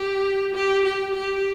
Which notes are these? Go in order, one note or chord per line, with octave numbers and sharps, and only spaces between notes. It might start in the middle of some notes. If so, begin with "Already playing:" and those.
Already playing: G4
G4
G4
G4